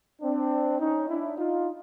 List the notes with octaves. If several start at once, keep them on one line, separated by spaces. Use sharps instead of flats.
C4 D4
C#4 D#4
D4 E4
D#4 F4